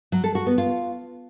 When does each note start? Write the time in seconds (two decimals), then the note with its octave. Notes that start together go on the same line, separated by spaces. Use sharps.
0.12 F#3
0.24 A4
0.35 F#4
0.46 B3
0.58 F4